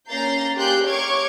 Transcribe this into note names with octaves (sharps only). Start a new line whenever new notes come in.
A#3 C#4 A#5 G6 A6 C7
A#3 G4 G#5 C6 F#6 G6
A#3 C#5 C#6 D6 F6 G#6